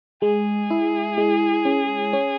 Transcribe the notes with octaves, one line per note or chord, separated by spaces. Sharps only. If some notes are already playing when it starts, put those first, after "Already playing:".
G#3 G#4
E4
G#3
C#4
C#4